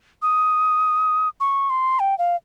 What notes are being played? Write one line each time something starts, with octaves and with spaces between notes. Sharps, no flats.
D#6
C#6
C6
G5
F5